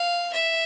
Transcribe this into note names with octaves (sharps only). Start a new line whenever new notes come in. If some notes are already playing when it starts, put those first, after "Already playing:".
Already playing: F5
E5